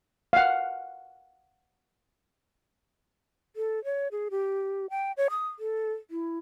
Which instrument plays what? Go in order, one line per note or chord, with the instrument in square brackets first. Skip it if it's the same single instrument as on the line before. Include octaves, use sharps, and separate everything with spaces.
[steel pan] F5 F#5
[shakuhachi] A4
C#5
G#4
G4
G5
C#5
D#6
A4
E4